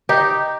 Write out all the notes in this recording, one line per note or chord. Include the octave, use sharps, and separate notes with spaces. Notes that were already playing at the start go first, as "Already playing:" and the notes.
D#4 G4